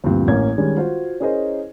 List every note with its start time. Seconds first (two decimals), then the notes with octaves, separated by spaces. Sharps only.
0.04 D2 G2 A#2 F3 C4
0.28 A1 A#3 C#4 G#6
0.58 D#3 G3 G#3 C#4 D4
0.77 F4 F#4 C5
1.20 C#4 E4 G#4 A#4 C5 D#5